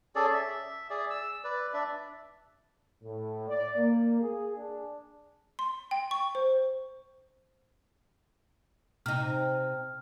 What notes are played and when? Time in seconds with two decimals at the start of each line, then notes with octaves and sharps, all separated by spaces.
0.15 C#4 G#4 A4 D5
0.33 E5
0.90 G#4 D5
1.10 E6
1.44 B4 D5
1.73 D4 D5 E5
3.04 A2
3.49 D5
3.77 A#3
4.22 G#4
4.57 D4
5.59 C6
5.91 G5
6.11 C#6
6.35 C5
9.06 C3 D#4 F6